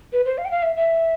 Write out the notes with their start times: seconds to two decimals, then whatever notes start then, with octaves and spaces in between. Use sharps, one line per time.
0.13 B4
0.25 C5
0.38 F5
0.45 G5
0.51 F5
0.63 E5
0.76 E5